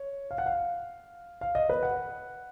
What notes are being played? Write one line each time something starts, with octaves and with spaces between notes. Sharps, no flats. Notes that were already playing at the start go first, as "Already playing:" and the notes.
Already playing: C#5
F5
F#5
F5
F5
D#5
B4
F#5